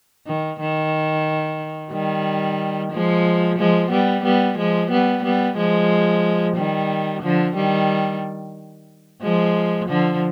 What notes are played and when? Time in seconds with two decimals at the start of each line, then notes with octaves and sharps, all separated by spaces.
0.27 D#3
0.60 D#3
1.92 D#3 G3
2.92 F3 G#3
3.58 F3 G#3
3.91 G3 B3
4.24 G3 B3
4.58 F3 G#3
4.91 G3 B3
5.24 G3 B3
5.57 F3 G#3
6.57 D#3 G3
7.22 D3 F3
7.56 D#3 G3
9.22 F3 G#3
9.88 D3 F3